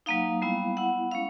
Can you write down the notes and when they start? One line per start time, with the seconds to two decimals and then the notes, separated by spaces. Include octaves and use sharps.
0.06 F#3 A#3 D#4 F5
0.42 G3 B3 E4
0.77 B3 E4 F#5
1.11 G#3 C#4 E4 F5